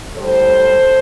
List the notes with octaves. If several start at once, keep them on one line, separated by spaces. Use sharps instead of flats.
A2 G3 A4 C5